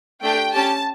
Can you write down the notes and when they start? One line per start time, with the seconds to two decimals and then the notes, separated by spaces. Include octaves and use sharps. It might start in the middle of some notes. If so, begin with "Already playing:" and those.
0.23 A3 D4 G4 G5
0.53 C#4 G4 A5